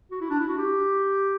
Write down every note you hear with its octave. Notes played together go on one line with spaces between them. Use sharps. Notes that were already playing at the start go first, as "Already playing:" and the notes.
F#4
E4
D4
E4
F#4
G4